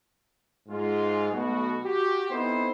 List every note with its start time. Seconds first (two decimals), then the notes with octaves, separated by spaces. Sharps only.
0.69 G#2 G#3 F4
1.32 B1 B2 A3 F#4
1.84 F#4 G4
2.30 B3 C4 D#4 E4 A4 C5